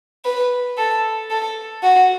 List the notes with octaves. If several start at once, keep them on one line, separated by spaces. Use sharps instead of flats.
B4
A4
A4
F#4